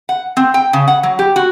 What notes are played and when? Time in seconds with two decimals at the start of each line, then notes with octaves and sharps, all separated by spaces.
0.09 F#5
0.37 C4
0.54 G5
0.73 C#3
0.88 F#5
1.03 F#3
1.19 G4
1.36 F#4